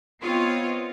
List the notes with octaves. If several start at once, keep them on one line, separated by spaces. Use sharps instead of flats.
B3 C4 F4 C#5 D#5 F5